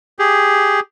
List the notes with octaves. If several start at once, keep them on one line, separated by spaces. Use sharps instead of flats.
G4 G#4